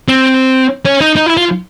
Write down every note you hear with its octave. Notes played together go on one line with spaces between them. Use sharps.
C4
C#4
D#4
D#4
E4
F4